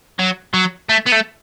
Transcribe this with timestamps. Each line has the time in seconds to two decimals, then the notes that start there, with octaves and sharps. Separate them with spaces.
0.19 F#3
0.54 F#3
0.89 A3
1.06 B3
1.12 A3